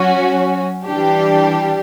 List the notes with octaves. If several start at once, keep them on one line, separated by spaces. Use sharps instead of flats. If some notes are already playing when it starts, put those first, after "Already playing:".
Already playing: F#3 C#4 F#4
E3 G3 D4 G4